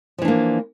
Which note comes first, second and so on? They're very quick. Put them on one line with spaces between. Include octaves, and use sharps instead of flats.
F3 E3 D4 A#3